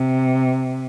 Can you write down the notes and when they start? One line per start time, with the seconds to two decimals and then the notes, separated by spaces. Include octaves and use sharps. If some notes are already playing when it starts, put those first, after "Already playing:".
Already playing: C3